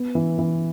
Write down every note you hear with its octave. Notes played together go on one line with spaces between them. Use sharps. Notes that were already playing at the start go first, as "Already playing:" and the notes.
Already playing: B3
E3
E3